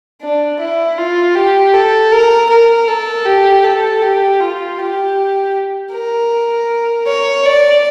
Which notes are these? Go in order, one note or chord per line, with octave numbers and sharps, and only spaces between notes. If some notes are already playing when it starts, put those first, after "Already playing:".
D4
E4
F4
G4
A4
A#4
A#4
A4
G4
A4
G4
F4
G4
A#4
C#5
D5